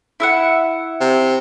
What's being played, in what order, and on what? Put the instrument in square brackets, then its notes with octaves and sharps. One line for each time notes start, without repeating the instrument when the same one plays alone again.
[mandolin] E4 E5 F#5
[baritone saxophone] C3